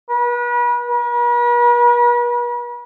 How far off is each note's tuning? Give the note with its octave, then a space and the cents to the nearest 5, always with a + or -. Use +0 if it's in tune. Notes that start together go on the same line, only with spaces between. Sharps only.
B4 -35
B4 -45